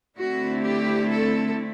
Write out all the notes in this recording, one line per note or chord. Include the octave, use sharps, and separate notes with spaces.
D3 A3 C4 E4 F#4
G4
A4